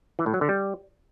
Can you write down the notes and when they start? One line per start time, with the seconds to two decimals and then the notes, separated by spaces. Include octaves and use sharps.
0.19 E3
0.26 A2
0.34 F#3
0.41 D3
0.49 G3